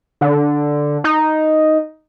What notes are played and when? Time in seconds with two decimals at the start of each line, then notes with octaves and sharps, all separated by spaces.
0.21 D3
1.04 D#4